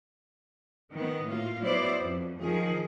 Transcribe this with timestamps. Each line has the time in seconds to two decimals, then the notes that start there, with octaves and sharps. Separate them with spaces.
0.92 D#3 B3
1.26 A2 A#3 F4
1.63 F#3 B3 E4 C5 D5
2.00 F2
2.40 D#3 F3 G#4